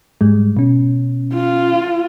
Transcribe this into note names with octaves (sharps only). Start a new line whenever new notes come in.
G#2 G3 G#3
B2 C#4
F4